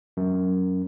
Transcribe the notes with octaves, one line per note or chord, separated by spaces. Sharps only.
F#2